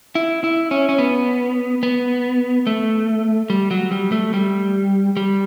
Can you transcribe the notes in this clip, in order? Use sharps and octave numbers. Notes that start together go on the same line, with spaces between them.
E4
E4
C#4
C#4
B3
B3
A3
G3
F#3
G3
A3
G3
G3